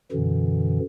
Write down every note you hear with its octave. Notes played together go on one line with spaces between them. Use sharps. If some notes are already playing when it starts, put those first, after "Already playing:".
F#2 B2 D3 E3